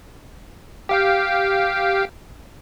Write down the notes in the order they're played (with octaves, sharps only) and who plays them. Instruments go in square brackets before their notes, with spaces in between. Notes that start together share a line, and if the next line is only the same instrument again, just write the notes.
[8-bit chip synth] G4 F5 G5